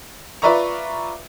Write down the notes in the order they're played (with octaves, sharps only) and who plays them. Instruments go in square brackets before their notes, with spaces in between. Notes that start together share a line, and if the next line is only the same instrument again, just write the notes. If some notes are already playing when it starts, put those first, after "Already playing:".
[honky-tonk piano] F4 B4 D5 E5 A#5 C#6